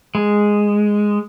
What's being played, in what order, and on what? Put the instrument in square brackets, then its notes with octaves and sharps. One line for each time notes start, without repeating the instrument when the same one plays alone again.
[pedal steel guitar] G#3